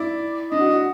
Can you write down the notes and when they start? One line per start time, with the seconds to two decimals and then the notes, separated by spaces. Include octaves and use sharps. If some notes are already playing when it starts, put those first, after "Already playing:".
Already playing: E4 D5
0.51 D4 D#5
0.60 F#4
0.71 F#4